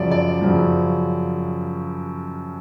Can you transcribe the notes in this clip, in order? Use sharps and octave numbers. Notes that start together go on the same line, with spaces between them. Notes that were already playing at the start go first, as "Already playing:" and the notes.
Already playing: F#2 C#3 F3 D5
D5
F#2 C#3 F3